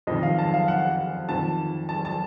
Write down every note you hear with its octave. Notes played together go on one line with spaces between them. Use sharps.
F2 D#3 D#5
F5
A5
F5
F#5
F2 D#3 A5
A5
A5